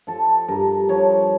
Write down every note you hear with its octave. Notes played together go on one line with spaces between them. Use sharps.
F3 A4
G2 A#4
F3 C#5